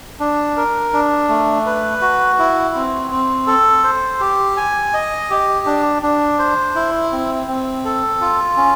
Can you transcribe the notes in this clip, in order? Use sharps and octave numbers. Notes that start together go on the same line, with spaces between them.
D4
A#4
D4
A3
B4
F#4
E4
C4
C4
A4
C5
G4
G#5
D#5
G4
D4
D4
C5
E4
C4
C4
A4
F4
C#4